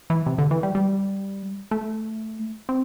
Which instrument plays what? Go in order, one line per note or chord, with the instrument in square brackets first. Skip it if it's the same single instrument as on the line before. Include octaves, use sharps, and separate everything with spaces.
[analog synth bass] E3
C3
D3
E3
G3
G3
A3
C4